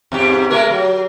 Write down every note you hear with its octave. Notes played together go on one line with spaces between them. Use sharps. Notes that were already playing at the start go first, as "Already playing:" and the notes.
E2 G#2 G4
G#3 A3 A#4
F#3